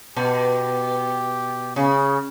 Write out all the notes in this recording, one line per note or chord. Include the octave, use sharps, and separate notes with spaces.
B2 G4
C#3 G#4